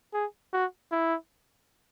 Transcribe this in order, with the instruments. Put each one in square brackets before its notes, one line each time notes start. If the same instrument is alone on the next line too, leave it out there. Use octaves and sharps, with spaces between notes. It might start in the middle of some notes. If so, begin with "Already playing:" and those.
[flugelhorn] G#4
F#4
E4